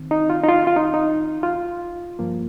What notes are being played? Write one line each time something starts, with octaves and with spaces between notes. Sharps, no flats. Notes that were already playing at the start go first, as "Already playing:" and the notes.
Already playing: D#3 C4
D#4
F4
D#4
F4
F4
D#4
D#4
F4
G2 F3 A#3